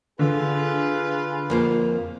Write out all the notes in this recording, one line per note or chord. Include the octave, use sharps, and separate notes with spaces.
D3 F4 G#4 B4
F2 A#3 C5